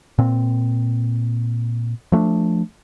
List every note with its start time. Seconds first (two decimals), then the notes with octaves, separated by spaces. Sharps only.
0.18 A#2 C4
2.12 F3 A3 C#4 D4